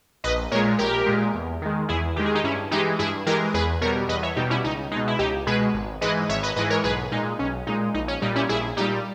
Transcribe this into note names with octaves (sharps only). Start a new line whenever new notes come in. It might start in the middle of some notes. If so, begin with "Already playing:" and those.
A#1 B4 D#5
A#2 G#3 A#4 C#5
A#1 G4 A#4
A#2 G#3
E2
D#3 G#3
E2 E4 G#4
D#3 G#3 G4
G#4
D#4 G4
G2 C#4 E4
E3 G#3 D#4 G4
G2 E4 G#4
E3 G#3 G4 A#4
E2 G#4 B4
B2 G3 A#4 C#5
E2 B4 D#5
C#5 E5
B2 G3 D#4 G4
C#4 E4
C#2 D#4
B2 G#3 D#4
E4
C#2 D#4 G4
B2 G#3 G#4 B4
G#1
G#2 E3 G#3 B4 D#5
G#1 C#5 E5
B4 D#5
G#2 E3 G#3 B4 D#5
A#4 C#5
B1 G#4 B4
A#2 G#3 D#4
B1 C#4
A#2 G#3 D#4
A#1 D#4
C#4
A#2 G3 D#4
C#4 E4
A#1 E4 G#4
A#2 G3 D#4 G4